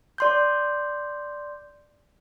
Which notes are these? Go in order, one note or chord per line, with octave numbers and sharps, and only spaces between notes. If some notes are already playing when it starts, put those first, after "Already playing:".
D5 C6 G6